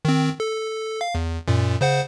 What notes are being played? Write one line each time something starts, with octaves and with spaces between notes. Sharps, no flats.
D#3 C4
A4
F5
E2
F#2 A#2
C#3 C5 F#5